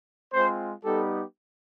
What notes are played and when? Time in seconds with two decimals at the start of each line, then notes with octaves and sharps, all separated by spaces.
0.33 G#3 C4 F4 C5
0.84 G3 B3 D#4 G4 A4